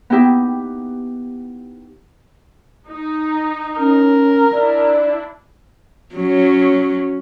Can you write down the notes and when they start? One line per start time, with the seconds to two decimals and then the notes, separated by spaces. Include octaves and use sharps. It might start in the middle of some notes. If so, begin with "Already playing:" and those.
0.10 B3 D#4 E4 G4 E5
2.89 D#4
3.79 C#4 A#4
4.53 D4 E4 D5
6.16 F#3 C#4